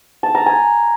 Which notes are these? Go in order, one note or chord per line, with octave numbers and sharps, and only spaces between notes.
A5
A#5
G#5